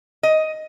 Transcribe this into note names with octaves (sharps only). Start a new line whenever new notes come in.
D#5